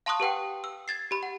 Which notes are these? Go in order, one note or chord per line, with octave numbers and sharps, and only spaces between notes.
F5 A5 C6 C#6 D#6 F#6
G4 B4 F#5 G5
E6
G#6 A6 C7
G4 B5
F#5